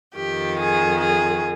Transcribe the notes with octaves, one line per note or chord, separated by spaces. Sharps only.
F2 D#3 G4
G#4
G#4